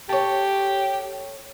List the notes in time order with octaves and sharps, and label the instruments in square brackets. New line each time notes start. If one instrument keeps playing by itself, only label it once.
[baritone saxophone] G4 [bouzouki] A4 C#5